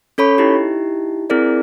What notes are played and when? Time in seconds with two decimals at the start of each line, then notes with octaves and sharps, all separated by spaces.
0.18 C#4 A4 C#5 B5 C#6
0.38 D#4 E4 G4
1.30 C4 E4 G#4 A#4 D5